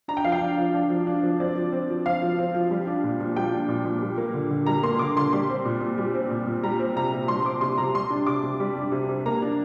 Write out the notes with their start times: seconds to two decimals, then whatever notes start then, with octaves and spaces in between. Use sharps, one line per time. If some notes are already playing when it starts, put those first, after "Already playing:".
0.08 D4 A#5
0.17 G5
0.24 F3 F5
0.32 G5
0.41 D4
0.58 F3
0.74 D4
0.90 F3
1.07 D4
1.23 F3
1.40 C4 D5
1.56 F3
1.72 C4
1.89 F3
2.06 C4 F5
2.22 F3
2.38 C4
2.55 F3
2.71 G3
2.87 D4
3.04 A#2
3.20 A#2
3.36 G3 G5
3.52 D4
3.69 A#2
3.85 A#2
4.02 G3
4.18 A#3
4.34 D3
4.50 D3
4.66 G3 A#5
4.83 A#3 C6
4.99 D3 D6
5.16 D3 C6
5.33 G3 C6
5.49 C4
5.65 A#2
5.81 A#2
5.98 G3
6.14 C4
6.31 A#2
6.46 A#2
6.63 G3 A#5
6.79 C4
6.96 C3 A#5
7.13 C3
7.28 G3 C6
7.45 C4 D6
7.61 C3 C6
7.78 C3 A#5
7.94 G3 C6
8.10 D4
8.26 C3 D6
8.43 C3
8.60 G3
8.77 D4
8.92 C3
9.09 C3
9.26 A#3 A#5
9.42 D4